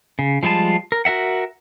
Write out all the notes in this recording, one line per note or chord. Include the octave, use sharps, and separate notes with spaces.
C#3
F3 G3 G#3 F4 A5
A#4
F#4 A#4 E5 F#5